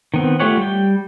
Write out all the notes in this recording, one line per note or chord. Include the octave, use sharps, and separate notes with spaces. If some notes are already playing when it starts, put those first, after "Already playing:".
D#3 B3 C4
A3 F4 G4 C#5 F#5
G3 G5